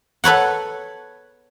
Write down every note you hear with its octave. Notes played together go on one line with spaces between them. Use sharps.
A4 B4 C#5 F#5